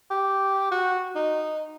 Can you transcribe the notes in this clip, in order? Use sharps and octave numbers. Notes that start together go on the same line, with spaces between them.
G4
F#4
D#4